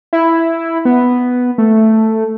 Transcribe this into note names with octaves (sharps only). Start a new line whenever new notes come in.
E4
B3
A3